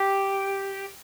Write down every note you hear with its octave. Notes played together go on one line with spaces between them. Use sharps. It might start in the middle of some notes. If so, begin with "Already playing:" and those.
Already playing: G4